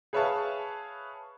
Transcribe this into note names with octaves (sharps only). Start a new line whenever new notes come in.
G#4 B4 C#5 E5 F5 A5